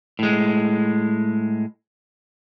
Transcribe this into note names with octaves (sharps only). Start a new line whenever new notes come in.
A2 G#3